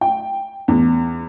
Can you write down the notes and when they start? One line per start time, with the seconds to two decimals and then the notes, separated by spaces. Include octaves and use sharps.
0.01 G5
0.68 E2